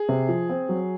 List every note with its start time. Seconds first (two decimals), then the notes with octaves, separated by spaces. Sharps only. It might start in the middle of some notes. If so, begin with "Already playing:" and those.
Already playing: G#4
0.09 C3
0.29 F3
0.49 C4
0.69 F#3